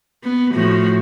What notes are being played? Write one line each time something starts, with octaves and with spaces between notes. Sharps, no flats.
B3
A2 F3 F#4